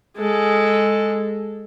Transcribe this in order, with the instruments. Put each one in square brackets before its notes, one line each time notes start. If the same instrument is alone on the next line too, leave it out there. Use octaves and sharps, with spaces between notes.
[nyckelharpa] G#3 A4